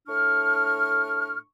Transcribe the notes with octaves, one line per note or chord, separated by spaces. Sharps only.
A2 D4 C#6 F6